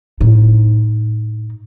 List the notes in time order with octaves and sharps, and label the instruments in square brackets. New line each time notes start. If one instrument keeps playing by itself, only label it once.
[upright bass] A2 D#4